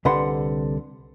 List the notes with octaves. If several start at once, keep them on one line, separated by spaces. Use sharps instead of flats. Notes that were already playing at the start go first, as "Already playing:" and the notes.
C2 D3 B4 F#5 C6